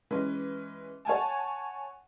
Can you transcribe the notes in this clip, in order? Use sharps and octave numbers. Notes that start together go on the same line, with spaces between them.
E3 G#3 C#4 B4
C#5 F#5 G#5 A5